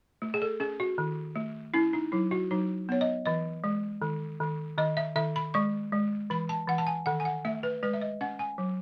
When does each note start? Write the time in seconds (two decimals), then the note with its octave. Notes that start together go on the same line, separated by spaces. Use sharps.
0.22 A3
0.34 G#4
0.42 A4
0.60 C#4 G#4
0.80 F#4
0.98 D#3
1.36 A3
1.74 C#4 E4
1.93 D#4
2.12 F#3 E4
2.31 F#4
2.51 F#3 D#4
2.89 B3 C#5
3.01 D#5
3.26 E3 D#5
3.64 G#3
4.02 D#3
4.40 D#3
4.78 D#3 D#5
4.97 E5
5.16 D#3 E5
5.36 B5
5.54 G#3 C#6
5.92 G#3
6.30 E3 B5
6.49 A5
6.68 E3 F#5
6.78 A5
6.87 G#5
7.06 D#3 F#5
7.20 G#5
7.25 F#5
7.45 A3 E5
7.63 B4
7.83 G#3 B4
7.93 E5
8.01 D#5
8.21 C#4 F#5
8.39 G#5
8.58 F#3